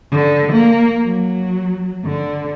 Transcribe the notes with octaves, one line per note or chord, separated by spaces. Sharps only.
D3
A#3
F#3
D3